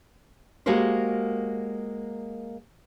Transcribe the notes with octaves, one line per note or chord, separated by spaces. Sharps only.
G#3 A#3 F#4 G4 A#4 C5